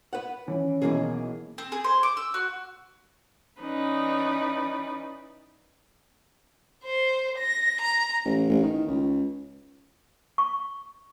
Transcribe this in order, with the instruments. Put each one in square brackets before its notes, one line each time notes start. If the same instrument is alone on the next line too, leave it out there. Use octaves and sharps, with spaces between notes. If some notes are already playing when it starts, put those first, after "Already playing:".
[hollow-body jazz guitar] B4 F#5
[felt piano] E3 [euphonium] C#4
[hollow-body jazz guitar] B1 E2 G#4 [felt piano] B2 E3 A#3
[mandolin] C4
G#4
C5
D6
E6
F#4
[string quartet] E3 C#4 D#4 B4 D5
[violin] C5
A#6
A#5
[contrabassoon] A1
A1
D#3
C#2
[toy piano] C#6